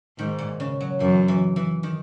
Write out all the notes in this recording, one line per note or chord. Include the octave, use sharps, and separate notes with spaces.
G#2 D#3
A#2
C#3
F#3
F#2 E3
E3
E3
D#3